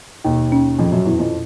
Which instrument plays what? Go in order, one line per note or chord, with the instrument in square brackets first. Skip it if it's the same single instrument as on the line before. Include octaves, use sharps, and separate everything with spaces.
[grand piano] D#2 D#3 [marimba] B2
[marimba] C#4
[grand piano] F2 F3 [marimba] A#2
[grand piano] F#2 F#3
[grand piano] E2 E3 [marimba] E4
[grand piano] F2 F3